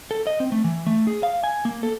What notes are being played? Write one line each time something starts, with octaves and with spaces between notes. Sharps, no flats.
A4
D#5
C4
A3
E3
A3
G#4
F5
G#5
A#3
A4